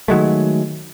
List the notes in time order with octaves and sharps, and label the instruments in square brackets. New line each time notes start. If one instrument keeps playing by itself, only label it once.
[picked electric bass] D#3 F#3 G#3 A3